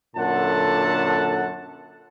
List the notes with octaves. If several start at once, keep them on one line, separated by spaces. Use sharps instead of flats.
F#2 A#2 D3 A4 F#5 A5